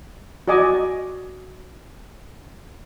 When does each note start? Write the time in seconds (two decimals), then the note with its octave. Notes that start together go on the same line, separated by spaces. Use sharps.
0.48 F#4 D5 D#5 G#5 D6